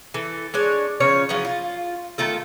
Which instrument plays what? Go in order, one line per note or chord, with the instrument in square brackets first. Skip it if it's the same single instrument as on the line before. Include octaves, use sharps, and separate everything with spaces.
[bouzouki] E3 A4
G#3 D4 C#5
C#3 F3 C#4 C#5
F3 F#3 E4 G#4
F4
D#3 A3 F4 A4